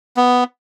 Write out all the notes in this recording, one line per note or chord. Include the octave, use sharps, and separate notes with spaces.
B3